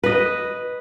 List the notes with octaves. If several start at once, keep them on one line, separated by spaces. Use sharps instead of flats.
B4 D#5